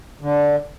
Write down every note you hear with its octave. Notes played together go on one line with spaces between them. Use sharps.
D3